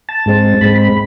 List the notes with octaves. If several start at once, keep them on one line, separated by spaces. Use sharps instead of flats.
A5
G#2 G#3 C4
G#2 G#3 C4 B5
B5